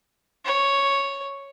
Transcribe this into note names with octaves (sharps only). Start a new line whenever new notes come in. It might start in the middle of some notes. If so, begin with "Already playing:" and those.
C#5